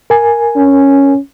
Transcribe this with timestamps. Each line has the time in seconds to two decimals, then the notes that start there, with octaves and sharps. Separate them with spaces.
0.10 A#4 G#5
0.56 C#4